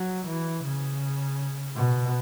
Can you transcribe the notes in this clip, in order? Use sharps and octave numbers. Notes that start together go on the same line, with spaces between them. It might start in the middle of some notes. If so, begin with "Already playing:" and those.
Already playing: F#3
E3
C#3
B2